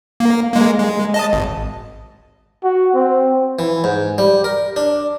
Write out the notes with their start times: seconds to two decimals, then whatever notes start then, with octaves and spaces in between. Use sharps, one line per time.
0.20 A#3
0.53 G#3 A#3
0.79 G#3
1.14 D#5 A5
1.33 G#1
2.64 F#4
2.95 C4
3.59 E3
3.84 G#2
4.18 G3
4.44 A#4
4.76 D4